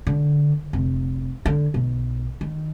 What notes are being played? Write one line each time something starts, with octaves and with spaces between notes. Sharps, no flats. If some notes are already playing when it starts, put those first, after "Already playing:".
D3
F1
D3
B1
D#3